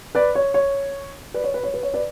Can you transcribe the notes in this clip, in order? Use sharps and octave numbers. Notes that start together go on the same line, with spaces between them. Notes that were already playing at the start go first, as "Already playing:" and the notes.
B4 D5
C#5
C#5
B4 D5
C#5
B4
C#5
B4
C#5
B4 D5